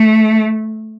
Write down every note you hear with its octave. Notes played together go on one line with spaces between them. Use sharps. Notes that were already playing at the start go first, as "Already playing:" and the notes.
Already playing: A3